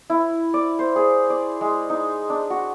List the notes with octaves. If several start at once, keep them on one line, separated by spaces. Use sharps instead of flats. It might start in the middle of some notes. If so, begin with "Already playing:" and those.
E4
D5
C5
G#4
D5
G#3
D#4
D4
F#4